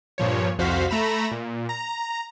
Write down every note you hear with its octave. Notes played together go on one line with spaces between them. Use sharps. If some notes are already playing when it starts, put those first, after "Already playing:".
G2 A#2 F3 C#5
C2 F2 F#4 C5 F5 B6
A3 A#5 B5 E7
A#2
A#5